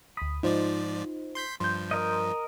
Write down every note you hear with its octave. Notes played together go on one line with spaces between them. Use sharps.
D2 B5 D#6
G#2 F3 D#4 F4 C5 D5
C6 G6 B6
G2 F3 C6 G6
A#4 D#5